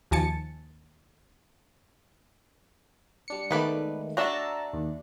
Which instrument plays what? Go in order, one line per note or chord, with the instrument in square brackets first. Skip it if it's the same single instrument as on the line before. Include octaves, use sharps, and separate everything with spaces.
[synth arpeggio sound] D#2 F3 G#5 A5 A6 C#7
[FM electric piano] G3 D4 C#7
[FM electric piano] D#3 G#3 A3 [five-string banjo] B3 B4 D5
[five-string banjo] A3 D4 F#4 [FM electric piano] A#5 E6 A6
[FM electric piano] D#2